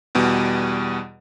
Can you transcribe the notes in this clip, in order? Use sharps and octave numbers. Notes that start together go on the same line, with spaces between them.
E2 B2 G3